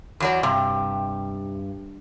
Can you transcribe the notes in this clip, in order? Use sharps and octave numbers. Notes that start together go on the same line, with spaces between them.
E2 F#3 D5
G2 C3